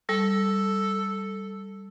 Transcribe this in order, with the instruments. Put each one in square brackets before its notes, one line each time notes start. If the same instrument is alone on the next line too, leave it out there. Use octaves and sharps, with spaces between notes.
[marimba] G3 [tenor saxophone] A4